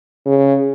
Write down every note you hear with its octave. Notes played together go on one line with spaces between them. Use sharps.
C#3